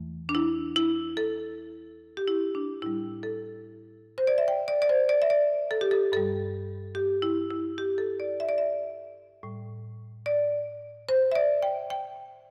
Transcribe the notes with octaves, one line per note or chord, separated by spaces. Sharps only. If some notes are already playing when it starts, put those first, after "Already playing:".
Already playing: E2 E3 A3
D4
E4
E4
A4
G4
E4
D4
A2 G3 E4
A4
C5
D5
E5
G5
D5
D5
C5
D5
E5
D5
A4
G4
A4
G2 G3 A4
G4
E4
E4
G4
A4
D5
E5
D5
E5
A2 G3
D5
C5
E5
D5
G5
G5